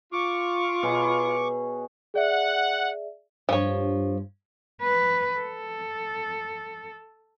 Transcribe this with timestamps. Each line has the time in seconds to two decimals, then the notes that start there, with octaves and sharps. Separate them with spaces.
0.13 F4 C#6 D6
0.83 B2 G#4 C#5
2.14 G#4 D5 E5 F#5
3.49 G2 F3 C#5
4.81 B4
5.40 A4